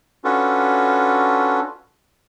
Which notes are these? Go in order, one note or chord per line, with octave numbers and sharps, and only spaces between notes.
C#4 D4 F4 F#4 A4 B4